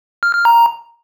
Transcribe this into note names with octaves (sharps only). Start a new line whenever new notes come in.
F6
F6
A#5